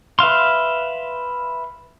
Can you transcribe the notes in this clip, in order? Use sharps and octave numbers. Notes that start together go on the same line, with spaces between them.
B4 E5 F5 C6